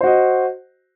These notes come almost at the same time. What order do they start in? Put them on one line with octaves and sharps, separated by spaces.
C5 F#4 D#5